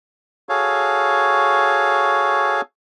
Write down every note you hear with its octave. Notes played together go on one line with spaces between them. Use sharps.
F#4 G#4 A4 C#5 F5